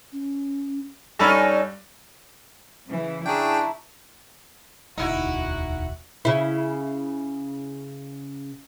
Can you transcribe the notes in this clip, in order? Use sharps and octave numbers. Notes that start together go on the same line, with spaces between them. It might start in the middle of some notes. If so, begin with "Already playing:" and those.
C#4
G2 C#4 D#4 A4 D5 B5
C#3 E3
D4 E4 G#4 G5 A5 A#5 C#6
E1 D2 D#4 E4 F#4 F#5
C#3 E4